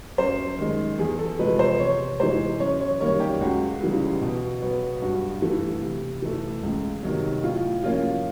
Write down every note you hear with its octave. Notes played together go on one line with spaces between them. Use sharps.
F#2 C5
D#3 G#3
E2 G#4
A4
C3 F3 G#3 B4
C5
C3 C#5
E3 G#3 C5
F#2 C#5
C#5
D#3 G3 A#3 C#5
G4
C#2 F#4
C#3 E3 G3
B2
F#3 B3
G2 F#4
E3 A3
C3
E3 A3
C#2
C3 D#3 F#3
A2 F4
F3 A#3 C#4 F4